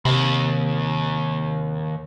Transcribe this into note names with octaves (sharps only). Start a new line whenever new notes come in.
D#2 C3